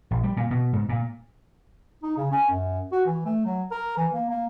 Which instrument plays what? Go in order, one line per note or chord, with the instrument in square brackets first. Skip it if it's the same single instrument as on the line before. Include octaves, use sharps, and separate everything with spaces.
[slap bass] A#1
G3
A#2
B2
G#2
A#2
[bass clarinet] D#4
C#3
C#4
F#2
F#4
E3
A3
F#3
A#4
E3
A#3
A#3